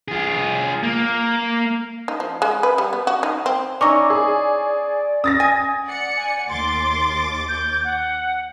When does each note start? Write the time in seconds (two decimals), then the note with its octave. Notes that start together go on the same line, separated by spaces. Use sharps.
0.08 F4 G#4
0.83 A#3
2.08 D#4
2.20 F3
2.42 G#3
2.63 B4
2.78 G3
2.93 B3
3.07 F#4
3.23 D#4
3.46 C4
3.81 C#4 D#4 E4 D5 C#6 D6
4.10 G#4
5.24 C#4 D#6 A6 A#6
5.40 G#5
5.85 D5 F#5 C#7
6.17 G#5
6.49 D#2 C6 D6 A6
7.49 G6
7.84 F#5